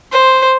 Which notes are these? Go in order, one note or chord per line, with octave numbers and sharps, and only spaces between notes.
C5